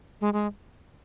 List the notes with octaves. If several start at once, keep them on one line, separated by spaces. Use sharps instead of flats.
G#3
G#3